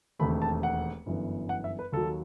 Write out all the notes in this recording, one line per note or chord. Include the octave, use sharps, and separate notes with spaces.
E1 D#2 D#3 A3 C4 B5
A5
F#5
G1 F#2 E3 B3
F#5
E5
B4
D#2 D#3 F#3 A4